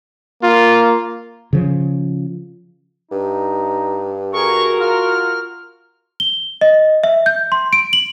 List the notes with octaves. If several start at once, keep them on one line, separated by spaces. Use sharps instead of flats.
A#3 F4
C#3 F3
G2 D#4
F#4 G#4 A#4 C#6
F4 F6
G7
D#5
E5
G6
C6
D7
F#7